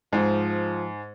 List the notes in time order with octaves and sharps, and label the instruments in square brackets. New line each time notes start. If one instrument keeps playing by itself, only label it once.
[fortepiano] G#2 [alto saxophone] F3